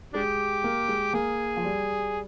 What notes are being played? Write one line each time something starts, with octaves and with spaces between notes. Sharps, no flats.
G#3 D4 G4
A#3
G#3
A#3 G#4
F3
G3